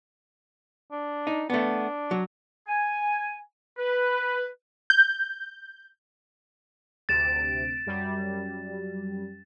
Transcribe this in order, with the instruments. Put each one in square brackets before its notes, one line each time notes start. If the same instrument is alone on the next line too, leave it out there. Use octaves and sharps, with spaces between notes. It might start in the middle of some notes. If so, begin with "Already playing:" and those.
[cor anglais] D4
[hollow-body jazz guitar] D#4
[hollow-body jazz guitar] A3 B3 [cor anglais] D4
[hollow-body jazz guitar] F#3
[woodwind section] G#5
B4
[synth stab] G6
[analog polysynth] D2 C3 D7 [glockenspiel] A6 E7
[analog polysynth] F#2 G3